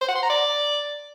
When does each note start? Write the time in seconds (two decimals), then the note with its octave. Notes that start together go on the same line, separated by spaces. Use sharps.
0.01 C5
0.08 F#5
0.16 C6
0.23 A#5
0.30 D5